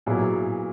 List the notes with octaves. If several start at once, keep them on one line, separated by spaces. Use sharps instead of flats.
A#2 F#3 B3 E4 G#4